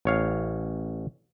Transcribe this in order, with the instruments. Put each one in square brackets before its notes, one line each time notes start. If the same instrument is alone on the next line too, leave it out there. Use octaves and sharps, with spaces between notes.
[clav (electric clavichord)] A1 C#5 F5